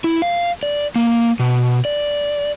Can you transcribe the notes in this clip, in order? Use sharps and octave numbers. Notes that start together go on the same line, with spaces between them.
E4
F5
D5
A#3
B2
D5